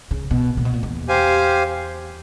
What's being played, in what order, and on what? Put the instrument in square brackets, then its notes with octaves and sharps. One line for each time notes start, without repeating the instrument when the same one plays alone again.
[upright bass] C#3
B2
A#2
B2
A#2
E2
[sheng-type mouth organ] G4 C5 F5 G#5